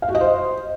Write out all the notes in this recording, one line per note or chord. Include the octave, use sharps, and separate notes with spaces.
F5
F#4
D#5
C5